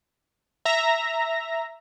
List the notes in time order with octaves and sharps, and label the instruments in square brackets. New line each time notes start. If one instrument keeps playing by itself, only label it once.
[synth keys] E5 A#5 A#6